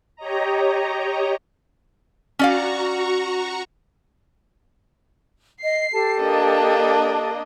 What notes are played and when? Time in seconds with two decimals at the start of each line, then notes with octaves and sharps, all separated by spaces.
0.16 G4 C#5 D#5 A#5
2.39 C#4 F#4 D5 F5 A#5 C#6
5.63 D#5 C7
5.92 G4 A4 A5
6.21 A#3 D4 D#5